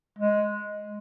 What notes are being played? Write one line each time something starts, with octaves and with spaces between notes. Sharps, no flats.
G#3